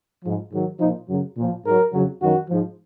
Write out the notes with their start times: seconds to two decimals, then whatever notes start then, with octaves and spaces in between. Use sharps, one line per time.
0.23 G#2 F3
0.51 G#2 D#3 F#3
0.79 A#2 F3 D#4
1.07 F#2 C#3 F#3
1.36 A#2 F3
1.65 G#2 F#3 A#4
1.92 F2 C#3 F#3
2.20 F#2 D#3 F#3 F#4
2.49 G#2 F3